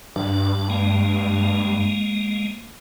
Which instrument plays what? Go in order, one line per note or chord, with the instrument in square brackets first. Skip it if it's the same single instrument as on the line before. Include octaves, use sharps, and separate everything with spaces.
[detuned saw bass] G2 [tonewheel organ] D4
[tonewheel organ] G#3 A#3